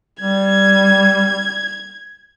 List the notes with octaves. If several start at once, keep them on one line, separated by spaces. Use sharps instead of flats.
G3 G#6